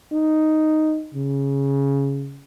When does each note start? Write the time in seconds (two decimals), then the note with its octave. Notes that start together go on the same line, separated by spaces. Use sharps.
0.12 D#4
1.15 C#3